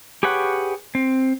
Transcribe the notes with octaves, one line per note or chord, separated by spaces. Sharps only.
G4 G#4 B4 C#5 F#5
C4